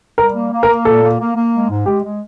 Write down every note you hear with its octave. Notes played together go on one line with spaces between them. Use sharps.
G3 A#4
A#3
A#3
A#4
A#3
A#2 A4
A#3
A#3
A#3
G#3
G#2
G#3 G4
G#3